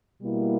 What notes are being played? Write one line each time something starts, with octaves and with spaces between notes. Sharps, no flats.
B2 G3 A#3 E4